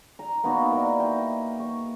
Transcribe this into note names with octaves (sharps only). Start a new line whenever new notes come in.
A#5
A#3 B3 D#4 F#4
E4 A#4 D5
D#5 G5
C#6